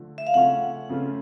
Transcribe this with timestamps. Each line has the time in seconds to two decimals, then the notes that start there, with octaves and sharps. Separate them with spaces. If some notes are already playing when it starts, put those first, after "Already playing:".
Already playing: D3 F3 A3
0.18 E5
0.27 F5
0.34 C#3 F3 A3 C#4 F4 F#5
0.89 C#3 F3 A3 C#4 F4